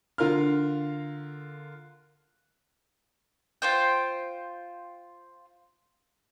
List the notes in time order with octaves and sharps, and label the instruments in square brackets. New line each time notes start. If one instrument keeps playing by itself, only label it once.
[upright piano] D3 F4 A#4 F5 F6
[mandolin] F4 C5 G5